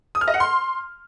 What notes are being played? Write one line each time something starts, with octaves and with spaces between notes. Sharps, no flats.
D#6
F6
D#5
F#5
C6